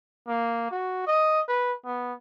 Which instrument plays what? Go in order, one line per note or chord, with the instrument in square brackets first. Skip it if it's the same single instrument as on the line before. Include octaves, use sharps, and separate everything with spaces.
[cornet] A#3
F#4
D#5
B4
B3